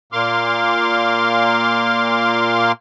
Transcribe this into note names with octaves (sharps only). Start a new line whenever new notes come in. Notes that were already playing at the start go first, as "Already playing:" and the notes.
A#2 A#3 C6 D6 F6